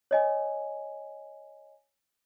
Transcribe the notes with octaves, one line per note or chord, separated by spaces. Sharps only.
C#5 D#5 G#5